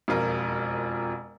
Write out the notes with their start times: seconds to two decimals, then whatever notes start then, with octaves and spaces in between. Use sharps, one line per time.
0.08 E1 F2 F4 A#4